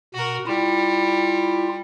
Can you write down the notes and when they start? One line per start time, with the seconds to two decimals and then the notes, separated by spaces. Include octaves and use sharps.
0.14 B2 F#4 A#4
0.46 G3 E4 F4